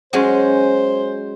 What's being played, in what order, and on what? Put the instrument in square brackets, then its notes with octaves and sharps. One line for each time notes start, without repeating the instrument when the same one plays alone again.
[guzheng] F#3 G#3 C#4 [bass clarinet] C5